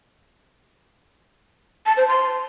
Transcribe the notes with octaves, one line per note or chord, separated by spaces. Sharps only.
A5
C5
C6